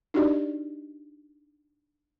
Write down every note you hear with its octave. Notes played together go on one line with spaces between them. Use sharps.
D4 D#4 F#4 G4 D5 D#5